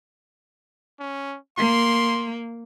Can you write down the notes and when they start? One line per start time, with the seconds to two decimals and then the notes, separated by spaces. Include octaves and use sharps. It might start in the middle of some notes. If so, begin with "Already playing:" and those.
1.00 C#4
1.57 A#3 C6